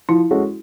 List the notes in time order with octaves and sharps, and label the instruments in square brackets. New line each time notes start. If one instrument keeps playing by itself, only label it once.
[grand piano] F3 [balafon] E4
[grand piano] G#3 C#4 F#4 A4